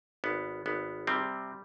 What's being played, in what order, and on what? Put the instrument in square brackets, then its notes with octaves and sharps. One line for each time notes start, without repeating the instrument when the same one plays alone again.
[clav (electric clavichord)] G#1 B3
G#1 B3
C3 G3 C4